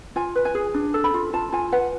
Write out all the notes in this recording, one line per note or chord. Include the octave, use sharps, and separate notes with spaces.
F4 G#5
B4
G#5
G#4
D4
A4
B5
F4
F4 A5
F4 G#5
B4 F#5